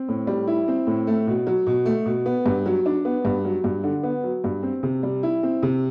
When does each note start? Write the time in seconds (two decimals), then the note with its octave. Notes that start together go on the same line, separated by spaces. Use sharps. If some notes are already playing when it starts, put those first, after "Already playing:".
Already playing: C4
0.09 A2
0.27 G3
0.47 E4
0.68 C4
0.87 A2
1.07 A3
1.27 B2
1.47 F#3
1.67 B2
1.86 A3
2.05 B2
2.26 B3
2.46 G2
2.66 F#3
2.86 D4
3.05 B3
3.25 G2
3.45 F#3
3.64 G2
3.84 D3
4.03 B3
4.24 F#3
4.44 G2
4.63 C4
4.83 C3
5.03 G3
5.23 E4
5.43 C4
5.63 C3